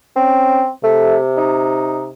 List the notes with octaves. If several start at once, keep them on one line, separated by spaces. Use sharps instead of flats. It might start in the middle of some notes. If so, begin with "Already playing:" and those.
C4 C#4
C3 A3
D#4